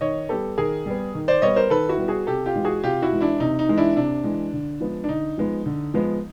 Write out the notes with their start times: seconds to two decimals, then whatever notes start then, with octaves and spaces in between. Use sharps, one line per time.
0.01 D#3 C#5 D#5
0.29 G3 B3 G4 A4
0.58 D#3 G#4 A#4
0.86 G3 B3
1.15 D#3
1.28 C5 D5
1.42 G3 B3 C#5 D#5
1.56 A#4 C5
1.70 D#3 A4 B4
1.89 E4 F#4
1.98 G3 B3
2.08 F#4 G#4
2.27 C3 G4 A4
2.46 F4 G4
2.55 E3 G#3
2.65 F#4 G#4
2.83 C3 F4 G4
3.02 E4 F#4
3.12 E3 G#3
3.21 D4 E4
3.40 C3 D#4
3.59 D#4
3.69 E3 G#3
3.77 D4 E4
3.96 C3 D4
4.24 E3 G#3
4.53 D3
4.81 F3 G#3 B3
5.04 D4
5.09 D3 D#4
5.38 F3 G#3 B3
5.66 D3
5.94 F3 G#3 B3